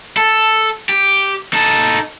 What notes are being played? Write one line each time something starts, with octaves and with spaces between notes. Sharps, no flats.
A4
G4
D#4 A4